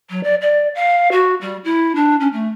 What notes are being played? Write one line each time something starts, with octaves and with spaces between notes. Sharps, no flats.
F#3
D5
D5
F5
F#4
G3
E4
D4
C#4
A3